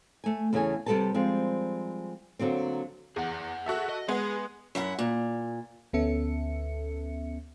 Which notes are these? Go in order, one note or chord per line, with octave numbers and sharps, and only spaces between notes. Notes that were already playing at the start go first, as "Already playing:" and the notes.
A3 G#5
E2 C#3 A3 C#5 G#5
C3 G3 A3 A4 B4 A5
F3 G3 G#3 C4
D3 F#3 A#3 C4
E2 G#4 F#5
F#4 A4 E5
D#5
G#3 B3 G#4
F#2 E4 F#5
A#2
D2 B3 C#4 A4 E5 C#7